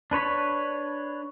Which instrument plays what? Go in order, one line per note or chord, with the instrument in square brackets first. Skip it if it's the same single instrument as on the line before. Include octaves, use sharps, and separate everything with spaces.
[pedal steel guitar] D4 B4 C#5 B5